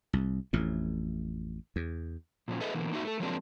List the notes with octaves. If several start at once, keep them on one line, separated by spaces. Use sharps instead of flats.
C2
A1 F2 A2
E2
A#2 F3 F#3 C#4
G#4 A4 B4 D#5 E5
B2 D3 E3 A#3
A#3 D4 D#4 F#4 E5
A3 A4
F3 F#3 G#3 A#3 C4 D4